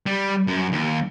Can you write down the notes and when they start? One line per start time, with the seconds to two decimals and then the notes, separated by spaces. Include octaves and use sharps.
0.06 G3
0.47 F#2
0.72 D#2